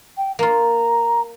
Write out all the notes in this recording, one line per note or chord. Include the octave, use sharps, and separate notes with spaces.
G5
A#3 F4 A#5